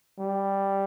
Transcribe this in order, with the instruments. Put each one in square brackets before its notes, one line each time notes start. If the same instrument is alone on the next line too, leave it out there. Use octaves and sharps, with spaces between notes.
[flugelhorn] G3